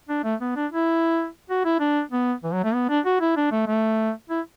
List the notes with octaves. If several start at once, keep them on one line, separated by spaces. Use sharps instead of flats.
D4
A3
B3
D4
E4
F#4
E4
D4
B3
E3
F#3
A3
B3
D4
F#4
E4
D4
A3
A3
E4